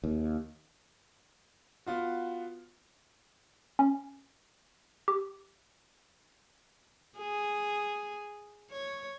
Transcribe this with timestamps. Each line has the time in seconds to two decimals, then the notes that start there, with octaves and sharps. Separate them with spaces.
0.04 D#2
1.86 B3 F4 F#4
3.79 C#4
5.08 G4
7.18 G#4
8.70 C#5